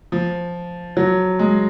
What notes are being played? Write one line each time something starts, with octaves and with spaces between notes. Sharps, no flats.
F3
F#3
G#3